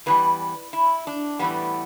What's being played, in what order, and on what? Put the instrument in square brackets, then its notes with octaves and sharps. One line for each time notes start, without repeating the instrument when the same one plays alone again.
[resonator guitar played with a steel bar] E2 E3 G3 B4
E4
D4
A2 E3 G3 B3